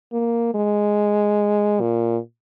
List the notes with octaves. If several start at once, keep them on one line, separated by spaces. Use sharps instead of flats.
A#3
G#3
A#2